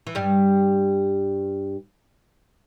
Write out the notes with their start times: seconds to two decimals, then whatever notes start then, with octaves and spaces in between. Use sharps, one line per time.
0.07 E3
0.15 G2 G3